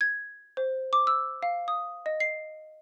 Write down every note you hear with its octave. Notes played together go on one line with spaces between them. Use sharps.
G#6
C5
D6
E6
F5
D#6
D#5
C7